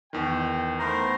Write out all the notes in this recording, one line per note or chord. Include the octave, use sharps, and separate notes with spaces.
E2 D#3 G5
A3 B3 A#4 C5 A#5